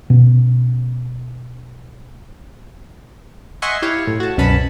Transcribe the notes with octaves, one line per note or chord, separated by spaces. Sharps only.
B2 C#4
D#5 E5 F#5 G#5 C6 C#6
E4 G4 C#5 F5
A2
F#4 A5
C2 F#2 B2 C#4 A5 B5